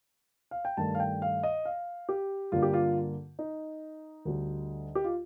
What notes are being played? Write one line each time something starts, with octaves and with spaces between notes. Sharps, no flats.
F5
G5
G2 D#3 A3 A5
F5
G5
F5
D#5
F5
G4
G2 D3 G3 A#3 F4
G4
F4
D#4
D2 D3 G3
G4
F4